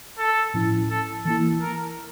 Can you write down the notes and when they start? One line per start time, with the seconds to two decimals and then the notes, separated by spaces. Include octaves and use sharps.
0.18 A4
0.54 A2 F3 C#4 E4
0.90 A4
1.25 E3 A#3 E4 A4
1.61 A#4